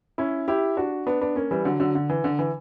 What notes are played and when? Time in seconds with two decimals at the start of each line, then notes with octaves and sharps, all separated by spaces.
0.18 C#4 E4
0.48 E4 G4
0.77 D4 F#4
1.07 B3 D4
1.21 B3 D4
1.36 A#3 C#4
1.51 E3 G3
1.65 D3 F#3
1.80 D3 F#3
1.95 D3
2.10 E3
2.24 D3
2.39 E3